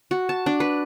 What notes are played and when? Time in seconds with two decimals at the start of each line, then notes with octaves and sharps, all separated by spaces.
0.11 F#4
0.29 A5
0.46 D4
0.60 B4